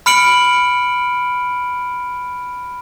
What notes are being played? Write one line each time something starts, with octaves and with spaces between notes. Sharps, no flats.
B5 F6 C#7 D7 F#7